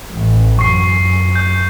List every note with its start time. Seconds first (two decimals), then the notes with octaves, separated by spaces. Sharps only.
0.12 A1
0.59 F#2 C#6 C7
1.35 G6